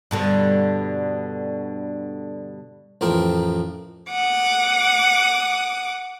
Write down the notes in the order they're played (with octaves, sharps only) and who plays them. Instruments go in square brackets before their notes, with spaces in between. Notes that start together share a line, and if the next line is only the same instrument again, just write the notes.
[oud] G2 B2 D3
[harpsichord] A1 F2 C4 A#4
[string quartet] F#5 D6 D#6